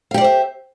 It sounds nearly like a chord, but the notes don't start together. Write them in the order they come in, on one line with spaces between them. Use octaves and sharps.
F5 G4 D5 C5 E5